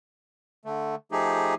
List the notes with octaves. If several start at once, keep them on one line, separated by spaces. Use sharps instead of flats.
D3 A3
F3 A3 D#4 G4 G#4